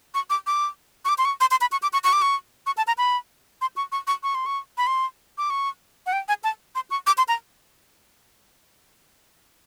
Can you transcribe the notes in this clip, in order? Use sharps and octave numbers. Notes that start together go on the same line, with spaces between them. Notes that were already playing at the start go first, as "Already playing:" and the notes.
C#6
D6
D6
C#6
D6
C6
C#6
C6
C6
B5
C#6
D6
C#6
C#6
D6
C#6
C#6
A5
A#5
B5
C6
C#6
C#6
C#6
C#6
C6
C#6
B5
C6
D6
C#6
F#5
G5
G#5
A5
C6
C#6
D6
C6
A#5